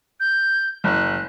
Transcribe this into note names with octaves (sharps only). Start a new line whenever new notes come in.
G6
F#1 F#6